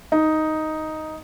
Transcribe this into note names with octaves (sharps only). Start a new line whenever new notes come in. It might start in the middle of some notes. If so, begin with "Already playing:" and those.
D#4